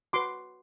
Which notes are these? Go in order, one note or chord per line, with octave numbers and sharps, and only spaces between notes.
F#4 B4 C6 D6